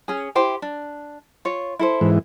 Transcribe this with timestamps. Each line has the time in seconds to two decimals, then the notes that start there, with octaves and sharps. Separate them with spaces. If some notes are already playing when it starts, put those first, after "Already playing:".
0.08 C#4 G#4
0.35 E4 G4 C5
0.62 D4
1.45 F4 C#5
1.79 E4 A4 C5
2.01 G#2 E3